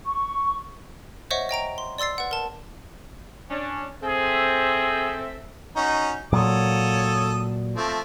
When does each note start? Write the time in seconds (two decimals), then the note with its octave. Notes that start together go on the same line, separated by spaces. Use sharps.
0.05 C#6
1.31 C5 C#5 D#5 E5 F#5 C#6
1.49 D#5 G5 A#5 D7
1.78 C6
1.98 D5 C6 E6 A6 C7
2.18 B4 F#5
2.31 A#4 A5
3.50 C#4 D4
4.03 C4 G#4 A4 E5
5.76 C#4 D#4 F#4
6.33 A#2 F#3 A4 C#5 D#6
7.76 F3 A3 C4